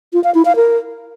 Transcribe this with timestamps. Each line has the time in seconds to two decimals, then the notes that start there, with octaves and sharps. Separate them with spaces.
0.13 F4
0.24 F5
0.35 E4
0.45 F5
0.56 A#4